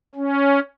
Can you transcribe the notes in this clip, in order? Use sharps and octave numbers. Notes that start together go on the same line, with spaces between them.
C#4